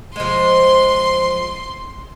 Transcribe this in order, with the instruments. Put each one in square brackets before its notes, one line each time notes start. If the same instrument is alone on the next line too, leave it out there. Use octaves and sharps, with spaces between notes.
[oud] F3 G#3 [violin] C6